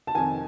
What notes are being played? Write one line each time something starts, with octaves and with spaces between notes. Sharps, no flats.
A5
F2 C3 D#3 G#5